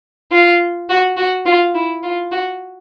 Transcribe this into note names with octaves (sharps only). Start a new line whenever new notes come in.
F4
F#4
F#4
F4
E4
F4
F#4